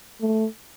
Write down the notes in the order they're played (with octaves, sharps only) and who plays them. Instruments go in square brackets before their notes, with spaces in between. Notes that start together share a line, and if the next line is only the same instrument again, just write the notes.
[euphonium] A3